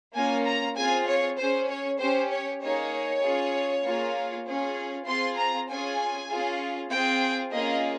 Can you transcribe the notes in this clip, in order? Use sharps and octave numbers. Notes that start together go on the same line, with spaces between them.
A#3 C#4 F4 G#5
A#5
C4 F4 G#4 G#5
C#5
C#4 G#4 C5
C#5
C#4 G4 C5
C#5
A#3 D#4 G#4 C#5
C#4 F4 G#4
A#3 F4 G#4
C#4 F4 G#4
C4 F4 G#4 C6
A#5
C#4 F4 G#4 G#5
C#4 F4 G#4
C4 F4 G#4 G5
A#3 C#4 F4 G#4 D#5